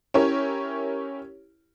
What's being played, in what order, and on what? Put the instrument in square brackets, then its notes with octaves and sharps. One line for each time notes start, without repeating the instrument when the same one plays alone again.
[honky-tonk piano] C#4 E4 G4 A#4 C#5